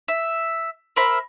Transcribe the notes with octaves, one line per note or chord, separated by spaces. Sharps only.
E5
A#4 C5 E5 B5